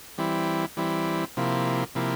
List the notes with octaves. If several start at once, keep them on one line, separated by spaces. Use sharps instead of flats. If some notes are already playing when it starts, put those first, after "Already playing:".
E3 G3 C4 E4
E3 G3 C4 E4
C3 F3 A#3 E4
C3 F3 A#3 E4